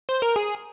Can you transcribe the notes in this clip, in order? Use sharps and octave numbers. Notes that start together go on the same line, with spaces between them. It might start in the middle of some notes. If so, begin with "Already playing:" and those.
C5
A#4
G#4